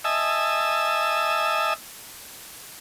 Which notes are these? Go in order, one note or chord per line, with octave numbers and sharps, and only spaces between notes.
D#5 E5 G#5 A5 E6